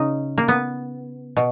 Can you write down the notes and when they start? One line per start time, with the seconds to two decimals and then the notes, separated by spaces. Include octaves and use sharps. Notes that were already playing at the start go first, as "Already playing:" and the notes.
Already playing: C#3 C#4 D#4
0.38 A#3
0.48 B3
1.37 B2